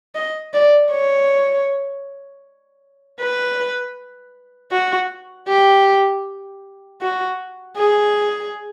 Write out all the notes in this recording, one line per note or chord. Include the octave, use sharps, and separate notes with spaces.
D#5
D5
C#5
B4
F#4
G4
F#4
G#4